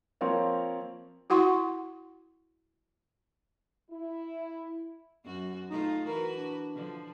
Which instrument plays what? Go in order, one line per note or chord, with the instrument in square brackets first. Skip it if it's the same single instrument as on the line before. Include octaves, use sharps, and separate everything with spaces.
[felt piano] F3 A#3 C4 A#4 C#5 D5
[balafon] E4 F#4 F#5 C6 C#6
[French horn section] E4
[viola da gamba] F#2 F#4
[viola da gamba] A3 F4 [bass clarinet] D#4
[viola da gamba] E3 F#4 B4 [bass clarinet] A#4
[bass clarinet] D4
[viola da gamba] D3 F3